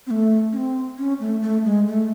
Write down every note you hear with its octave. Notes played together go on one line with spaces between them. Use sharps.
C4
A3
C#4
C4
C#4
A3
A3
G#3
A3